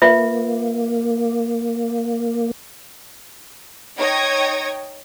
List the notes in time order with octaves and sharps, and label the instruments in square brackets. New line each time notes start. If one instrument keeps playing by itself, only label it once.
[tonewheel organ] A#3 [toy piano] F4 B4 E5
[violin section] D#4 C#5 G5 D#6 G#6 A#6